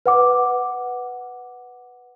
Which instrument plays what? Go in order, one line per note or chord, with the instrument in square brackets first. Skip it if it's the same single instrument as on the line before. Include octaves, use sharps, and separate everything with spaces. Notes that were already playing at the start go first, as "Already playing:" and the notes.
[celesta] B4 F#5 D6